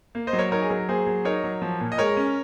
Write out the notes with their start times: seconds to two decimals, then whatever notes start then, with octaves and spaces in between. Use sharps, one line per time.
0.15 A#3
0.27 C5 D#5
0.33 F#3
0.39 A#4 C#5
0.51 D#4 A#4 C#5
0.62 G#4
0.70 F#3 A#4
0.88 A#3 G#4 C5
1.07 F#3
1.25 D#4 A#4 C#5
1.44 F#3
1.62 F3
1.81 A#2
1.92 D#5
1.98 G#3 A#4 C#5
2.17 C#4